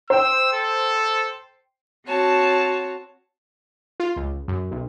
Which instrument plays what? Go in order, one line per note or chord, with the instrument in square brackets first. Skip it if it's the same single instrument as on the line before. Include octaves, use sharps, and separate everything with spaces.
[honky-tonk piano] C5 G5 [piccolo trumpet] E6
[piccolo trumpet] A4
[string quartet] C4 F#4 C#5 A5
[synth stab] F4
C#2
F#2
B1